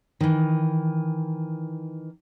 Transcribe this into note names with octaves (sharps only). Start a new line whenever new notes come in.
D#3 E3